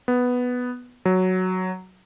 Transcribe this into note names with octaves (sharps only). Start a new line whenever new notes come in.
B3
F#3